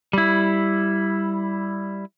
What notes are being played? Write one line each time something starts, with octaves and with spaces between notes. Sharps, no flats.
G3 E4